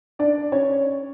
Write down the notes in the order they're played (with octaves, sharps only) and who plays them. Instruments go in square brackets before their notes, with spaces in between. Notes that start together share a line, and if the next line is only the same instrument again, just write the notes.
[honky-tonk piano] D4 D5
C#4 C#5